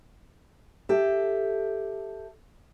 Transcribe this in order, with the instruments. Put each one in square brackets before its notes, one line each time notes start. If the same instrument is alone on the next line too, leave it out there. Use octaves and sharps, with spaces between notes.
[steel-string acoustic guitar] G4 A4 E5